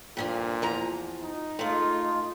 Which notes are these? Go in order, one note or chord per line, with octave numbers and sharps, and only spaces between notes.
G2 A#2 D3 F3
E2 F3 A#5
D#4
G#3 A3 F4